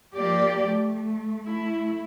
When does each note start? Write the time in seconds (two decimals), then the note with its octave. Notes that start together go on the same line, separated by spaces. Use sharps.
0.16 F3 A#3 G4 D5
0.69 A3
1.45 A3 E4